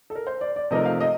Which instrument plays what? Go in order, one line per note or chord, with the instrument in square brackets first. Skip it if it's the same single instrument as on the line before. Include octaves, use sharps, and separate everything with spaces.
[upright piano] A4
A#4
C5
D5
D5
[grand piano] C3 F3 A3 D#4 A#4 [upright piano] D#5
[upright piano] F5
D#5